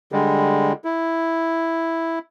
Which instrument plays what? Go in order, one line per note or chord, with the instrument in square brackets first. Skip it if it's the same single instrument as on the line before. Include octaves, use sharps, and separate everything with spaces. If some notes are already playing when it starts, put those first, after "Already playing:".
[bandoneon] D3 G3 G#3
E4